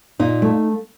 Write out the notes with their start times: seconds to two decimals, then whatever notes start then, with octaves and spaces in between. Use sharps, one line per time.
0.19 A#2 D#4
0.42 A3